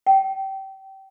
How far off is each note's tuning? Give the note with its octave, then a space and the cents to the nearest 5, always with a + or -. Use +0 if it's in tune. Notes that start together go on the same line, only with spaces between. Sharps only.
G5 -25